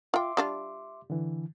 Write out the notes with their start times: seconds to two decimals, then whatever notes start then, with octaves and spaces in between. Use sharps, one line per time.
0.14 F4 E5 G5 C6 D6
0.37 G3 D4 F4
1.10 D3 E3